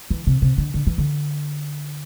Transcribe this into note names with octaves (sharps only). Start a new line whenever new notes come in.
E3
C3
C3
D3
D3
E3
D3